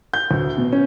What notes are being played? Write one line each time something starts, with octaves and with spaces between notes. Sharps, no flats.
G6
D2
B2
C#4